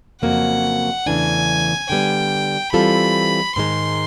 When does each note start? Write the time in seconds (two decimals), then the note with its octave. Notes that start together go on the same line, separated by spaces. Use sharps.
0.22 F2 C#3 F#3 A#3 F#5
1.06 E2 C#3 E3 A3 D4 G#5
1.89 D3 G3 B3 G5
2.73 E3 G3 C4 F4 A4 B5
3.56 G#2 D#3 G#3 C6